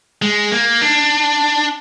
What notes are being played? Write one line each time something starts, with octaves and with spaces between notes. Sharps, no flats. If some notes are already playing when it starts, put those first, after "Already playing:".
G#3
A#3
D4